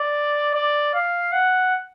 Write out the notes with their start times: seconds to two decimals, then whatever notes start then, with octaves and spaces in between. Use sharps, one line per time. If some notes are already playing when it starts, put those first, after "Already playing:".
Already playing: D5
0.54 D5
0.94 F5
1.33 F#5